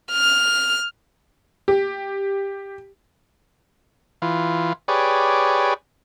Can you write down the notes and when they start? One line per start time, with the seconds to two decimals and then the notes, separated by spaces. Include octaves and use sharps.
0.12 F6
1.68 G4
4.22 E3 F4
4.88 G4 G#4 B4 C#5 D5